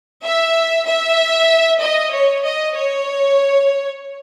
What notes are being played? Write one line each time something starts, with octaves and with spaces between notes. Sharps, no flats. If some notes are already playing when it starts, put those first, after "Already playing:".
E5
E5
D#5
C#5
D#5
C#5